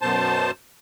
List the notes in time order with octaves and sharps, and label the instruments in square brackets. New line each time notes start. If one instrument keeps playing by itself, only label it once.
[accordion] F#2 B2 C5 A5